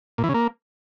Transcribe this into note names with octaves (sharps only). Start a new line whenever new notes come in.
A#2
E3
C#3
A#3